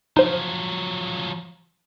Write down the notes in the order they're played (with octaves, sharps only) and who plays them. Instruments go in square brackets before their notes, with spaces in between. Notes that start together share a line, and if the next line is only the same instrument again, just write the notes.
[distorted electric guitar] F3 F#3 [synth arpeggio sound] D#4 C5